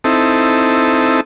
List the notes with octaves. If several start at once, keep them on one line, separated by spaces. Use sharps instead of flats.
C4 D#4 E4 A4